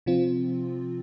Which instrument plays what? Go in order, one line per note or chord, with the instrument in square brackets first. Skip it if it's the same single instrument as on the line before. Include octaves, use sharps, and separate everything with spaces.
[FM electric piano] C3 F3 C4 F4